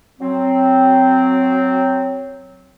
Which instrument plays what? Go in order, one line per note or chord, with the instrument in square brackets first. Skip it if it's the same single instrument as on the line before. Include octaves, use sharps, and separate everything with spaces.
[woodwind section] F#3 C4